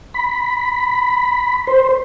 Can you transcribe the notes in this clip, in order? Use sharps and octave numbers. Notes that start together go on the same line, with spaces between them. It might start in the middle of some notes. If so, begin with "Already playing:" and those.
B5
C5